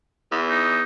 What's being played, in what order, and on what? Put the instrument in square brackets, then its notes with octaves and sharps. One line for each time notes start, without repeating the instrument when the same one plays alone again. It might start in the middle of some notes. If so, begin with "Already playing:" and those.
[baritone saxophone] E2
[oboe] D#4